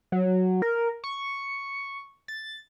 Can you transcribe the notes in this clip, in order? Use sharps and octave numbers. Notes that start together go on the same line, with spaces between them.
F#3
A#4
C#6
A6